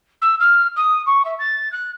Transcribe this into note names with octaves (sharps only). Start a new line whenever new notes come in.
E6
F6
D#6
C#6
E5
A6
F#6